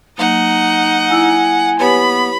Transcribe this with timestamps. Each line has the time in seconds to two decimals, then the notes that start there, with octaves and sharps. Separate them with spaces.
0.18 F#3 A#3 D#4 D#5 F#5
1.10 E4 G#5 E6
1.80 B3 G4 B4 C#5 B5